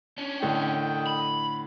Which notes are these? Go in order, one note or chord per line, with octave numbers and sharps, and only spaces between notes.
C#4 D4
A2 D3 D#5 G5
B5